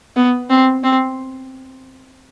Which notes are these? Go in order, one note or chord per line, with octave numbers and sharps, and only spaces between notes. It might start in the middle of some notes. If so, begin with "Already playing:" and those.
B3
C4
C4